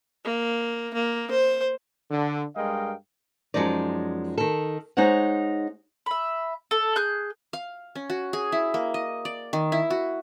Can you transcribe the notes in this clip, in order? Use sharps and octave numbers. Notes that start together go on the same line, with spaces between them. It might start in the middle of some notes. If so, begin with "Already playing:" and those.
A#3
A#3
C5
D3
G2 G#3 A#4 D#5 F5 G5
F#2 C3 F3 G#3 D#4 D5
D#3 A4
G#3 D#4 C5 C#5 F#5
E5 B5
A4
G#4 F#6 G6
F5
C#4
F#4
G#4
E4
A#3
D#5
D5
D#3
E4
F#4